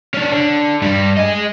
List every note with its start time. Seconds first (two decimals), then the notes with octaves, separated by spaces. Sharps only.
0.14 C#4 D4
0.31 D3
0.82 G2 G3
1.17 G#4 D#5